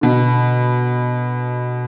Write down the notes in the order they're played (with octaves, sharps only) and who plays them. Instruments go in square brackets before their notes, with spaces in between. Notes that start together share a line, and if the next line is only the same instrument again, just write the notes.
[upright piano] B2 D3